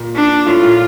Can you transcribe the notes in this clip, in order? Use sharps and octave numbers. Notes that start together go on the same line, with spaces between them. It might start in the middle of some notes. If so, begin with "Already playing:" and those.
Already playing: A#2
D4
A2 F4
A#2